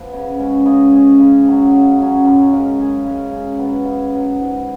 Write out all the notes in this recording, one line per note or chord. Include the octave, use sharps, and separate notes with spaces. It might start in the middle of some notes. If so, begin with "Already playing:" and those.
Already playing: F3 B3
C#3
G#3 C#4
C#3 D#5
G#3 C#4
C#3
F#3 C#4
C#3
F#3 C#4
F#2 A#4
C#3 G#3 C#4
F#2 G#4
C#3 G#3 C#4
C#3
F#3 B3
C#3 G#4
F#3 B3
G#2